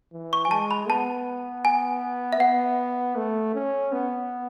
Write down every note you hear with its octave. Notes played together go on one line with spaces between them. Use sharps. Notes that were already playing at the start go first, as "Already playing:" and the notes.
E3
C#6
G#5
G#3 A5
B5
B3 A5
G#5
E5
B3 F#5
A3
C#4
B3